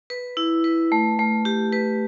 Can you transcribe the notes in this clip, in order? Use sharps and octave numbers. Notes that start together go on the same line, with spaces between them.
B4
E4
B4
A3
A3
G4
B4